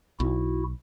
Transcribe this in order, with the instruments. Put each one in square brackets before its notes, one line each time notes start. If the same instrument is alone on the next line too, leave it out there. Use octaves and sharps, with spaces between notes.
[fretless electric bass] B1 [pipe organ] E4 F#4